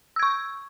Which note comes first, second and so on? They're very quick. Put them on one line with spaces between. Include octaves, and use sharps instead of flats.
E6 G#6 C#6